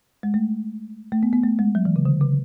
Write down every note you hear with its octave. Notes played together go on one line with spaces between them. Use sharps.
G#3
A3
A3
B3
B3
A3
G#3
F#3
E3
C#3
D3
C#3